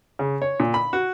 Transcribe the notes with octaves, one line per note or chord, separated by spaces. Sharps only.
C#3
C#5
A#2
B5
F#4